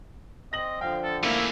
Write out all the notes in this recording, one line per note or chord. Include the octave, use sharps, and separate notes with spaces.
C4 D#5 A#6 F#7
D3 F3 F5 G5
A4
A3 A#3 C#4 E4